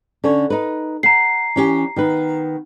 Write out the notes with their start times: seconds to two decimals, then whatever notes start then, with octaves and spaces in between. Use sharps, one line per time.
0.24 D3 C#4 C#5
0.50 D#4 B4
1.03 F#5 A#5 C7
1.56 E3 C#4 G4
1.96 D#3 B3 B4